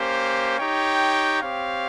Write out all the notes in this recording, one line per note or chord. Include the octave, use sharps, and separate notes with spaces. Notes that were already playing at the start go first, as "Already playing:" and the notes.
Already playing: A#3 C#4 G4 C5
D#4 G4 C#5 G5
C4 G4 C#5 F5